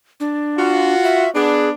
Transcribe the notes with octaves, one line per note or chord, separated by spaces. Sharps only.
D4
F4 F#4
E5
B3 D4 G#4